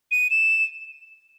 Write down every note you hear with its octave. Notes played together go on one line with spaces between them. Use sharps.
D#7
E7